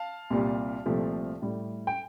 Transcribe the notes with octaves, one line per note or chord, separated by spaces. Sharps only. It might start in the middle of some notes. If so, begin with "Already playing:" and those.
Already playing: F5 A5
C2 A#2 G3
C2 A#2 F3 A3
A2 G3
G5